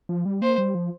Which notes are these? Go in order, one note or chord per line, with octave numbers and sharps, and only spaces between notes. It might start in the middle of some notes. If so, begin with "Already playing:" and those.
F3
G3
A#3 C5
G3
F3